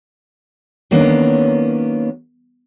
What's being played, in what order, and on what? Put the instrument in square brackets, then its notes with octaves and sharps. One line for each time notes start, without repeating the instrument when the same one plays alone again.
[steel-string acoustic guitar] D#3 F#3 A#3 B3 C#4 D4